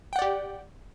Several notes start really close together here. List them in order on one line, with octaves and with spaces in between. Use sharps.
G5 F#5 D5 G4